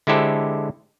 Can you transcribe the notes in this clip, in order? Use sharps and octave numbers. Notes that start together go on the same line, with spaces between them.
D3 G#3 E4 G4 A4 C5